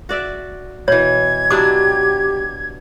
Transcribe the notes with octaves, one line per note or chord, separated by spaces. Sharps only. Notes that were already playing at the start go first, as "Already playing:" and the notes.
F#4 D5 E5
B2 E3 C#5 G#6
F#3 D4 E4 G4 D6